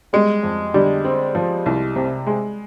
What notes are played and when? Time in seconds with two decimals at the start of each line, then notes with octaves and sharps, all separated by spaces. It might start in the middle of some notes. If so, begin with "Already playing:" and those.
0.13 G3 G#3
0.43 F2
0.74 D3 G3
1.04 C4
1.35 F3
1.66 C2
1.96 C3
2.27 G#3